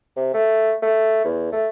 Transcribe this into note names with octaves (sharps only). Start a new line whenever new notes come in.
C3
A3
A3
E2
A3